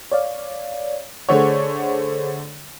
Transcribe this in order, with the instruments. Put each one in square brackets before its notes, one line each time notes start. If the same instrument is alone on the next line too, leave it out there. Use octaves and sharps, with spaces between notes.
[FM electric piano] C#5 D5 F5
[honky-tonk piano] D3 A3 C#5 [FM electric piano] G#4 C5 F#5